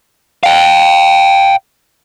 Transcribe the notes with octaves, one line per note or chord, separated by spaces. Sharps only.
F5 G5